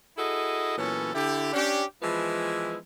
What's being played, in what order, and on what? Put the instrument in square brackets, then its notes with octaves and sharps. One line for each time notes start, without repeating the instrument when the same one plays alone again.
[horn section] E4 F#4 G#4 A4 D#5
A#2 E3 F#3 B3 C#4 A4
D3 E4 G4
C#4 D4 G4
E3 F3 G#3 B3 E4